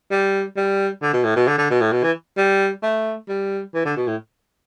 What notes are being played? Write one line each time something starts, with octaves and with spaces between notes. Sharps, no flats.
G3
G3
D3
B2
A2
B2
D3
D3
B2
A2
B2
E3
G3
A3
G3
E3
D3
B2
A2